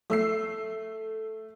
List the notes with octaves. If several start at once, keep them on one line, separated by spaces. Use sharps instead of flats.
A3 E6 C7